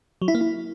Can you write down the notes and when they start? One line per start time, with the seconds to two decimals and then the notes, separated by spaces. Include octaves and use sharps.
0.22 F#3
0.28 E4
0.35 A#3
0.41 E4